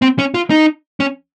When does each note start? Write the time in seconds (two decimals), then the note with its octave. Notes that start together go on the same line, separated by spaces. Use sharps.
0.02 C4
0.19 C#4
0.34 F4
0.50 D#4
1.00 C#4